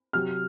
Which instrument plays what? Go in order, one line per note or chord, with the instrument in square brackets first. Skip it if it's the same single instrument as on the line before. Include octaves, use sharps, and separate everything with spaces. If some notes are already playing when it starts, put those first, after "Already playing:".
[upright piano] C3 F#3 F6